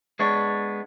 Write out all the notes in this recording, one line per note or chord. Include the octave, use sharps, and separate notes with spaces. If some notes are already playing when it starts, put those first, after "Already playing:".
G#3 B3 D4 C#5